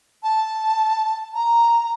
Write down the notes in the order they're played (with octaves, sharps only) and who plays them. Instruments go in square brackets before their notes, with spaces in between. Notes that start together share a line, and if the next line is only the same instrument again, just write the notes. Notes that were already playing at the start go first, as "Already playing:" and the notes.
[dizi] A5
A#5